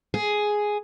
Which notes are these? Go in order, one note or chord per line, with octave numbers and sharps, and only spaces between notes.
G#4